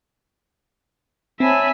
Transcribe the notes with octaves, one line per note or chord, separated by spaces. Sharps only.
C4 C#5 E5 G#5 A5 B5